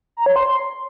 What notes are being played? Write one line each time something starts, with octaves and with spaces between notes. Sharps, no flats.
A#5
C#5
C6